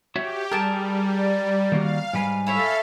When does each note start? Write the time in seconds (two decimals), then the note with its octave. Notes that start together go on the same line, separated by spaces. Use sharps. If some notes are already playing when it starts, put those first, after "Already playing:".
0.16 F#4 G4 C#5 E5
0.52 G3 G#4 A#4 G5 A5
1.16 D5
1.72 D#3 A#3 F#4 F5
2.13 G#2 G3 B4 G#5
2.47 E4 A4 C#5 E5 F5